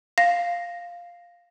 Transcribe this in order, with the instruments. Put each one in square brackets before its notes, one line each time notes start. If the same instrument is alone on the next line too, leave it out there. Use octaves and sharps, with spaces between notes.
[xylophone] F5 A#6